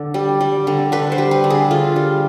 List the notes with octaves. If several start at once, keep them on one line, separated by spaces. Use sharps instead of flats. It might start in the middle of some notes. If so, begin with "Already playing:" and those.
Already playing: D3
G3
G3
D3
D3 B4
C5
G3
B4
D3
G#4
D3 F4
G3